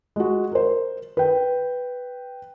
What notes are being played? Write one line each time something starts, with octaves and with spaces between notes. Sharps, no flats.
G#3 F#4
A#4 C5
B4 G5